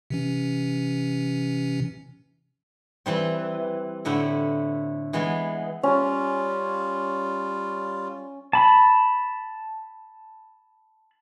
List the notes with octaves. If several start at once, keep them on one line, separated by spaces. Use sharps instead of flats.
C3 E3 C#4
E3 G3 C4
A2 D3 E4 F#5 G5
E3 G#3 B3
G3 C#4 F4 A#5
A5 B5